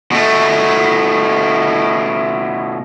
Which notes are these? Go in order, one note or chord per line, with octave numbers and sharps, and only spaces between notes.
B2 A3